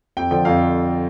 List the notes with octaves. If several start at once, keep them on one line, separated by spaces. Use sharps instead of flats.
F2 G5
D3 F3 G5
F2 F5